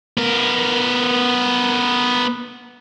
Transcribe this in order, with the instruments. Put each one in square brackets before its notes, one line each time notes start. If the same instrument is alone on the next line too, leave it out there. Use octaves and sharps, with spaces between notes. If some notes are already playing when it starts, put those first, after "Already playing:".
[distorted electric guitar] B3 A#4